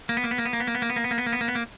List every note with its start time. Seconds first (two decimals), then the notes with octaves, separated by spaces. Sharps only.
0.09 A#3
0.17 B3
0.24 A#3
0.31 B3
0.38 A#3
0.45 B3
0.53 A#3
0.60 B3
0.67 A#3
0.75 B3
0.82 A#3
0.90 B3
0.96 A#3
1.04 B3
1.11 A#3
1.18 B3
1.26 A#3
1.33 B3
1.41 A#3
1.48 B3
1.55 A#3